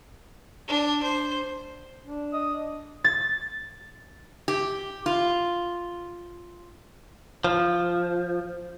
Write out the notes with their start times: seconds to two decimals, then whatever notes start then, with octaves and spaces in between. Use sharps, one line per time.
0.68 D4
1.03 C5
2.06 D4
2.33 D#5
3.04 A6
4.48 G4
5.06 F4
7.44 F3